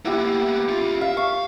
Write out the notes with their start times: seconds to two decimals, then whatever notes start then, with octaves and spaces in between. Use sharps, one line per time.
0.05 A#3 B3 E4 G4
0.68 C#4 F4
1.01 E5 F5
1.17 F5 C#6